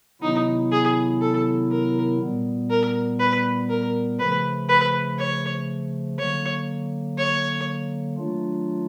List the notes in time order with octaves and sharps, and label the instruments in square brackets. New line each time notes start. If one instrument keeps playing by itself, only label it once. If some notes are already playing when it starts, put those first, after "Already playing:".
[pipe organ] C3 D#3 F#3 B3 E4 [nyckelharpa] D#4
[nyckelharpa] G#4
A4
A#4
[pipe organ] A#2 G3 B3
[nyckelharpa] A#4
B4
A#4
[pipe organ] C#3 F3 A3 [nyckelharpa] B4
[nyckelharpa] B4
C#5
[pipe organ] D3 F#3 A#3 [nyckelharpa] C#5
[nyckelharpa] C#5
[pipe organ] D#3 F#3 A3 D4 F4